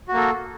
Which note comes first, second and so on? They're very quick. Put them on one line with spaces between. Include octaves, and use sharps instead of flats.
F#4 A#3 A4